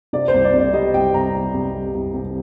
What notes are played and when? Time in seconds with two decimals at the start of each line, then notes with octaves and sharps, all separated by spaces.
0.13 C3 D5
0.28 C5
0.34 C2
0.44 D5
0.54 C3
0.59 D5
0.73 G3 D#5
0.94 C2 G5
1.14 C2 A#5
1.34 C2
1.54 C2
1.75 G3
1.94 C2
2.14 C2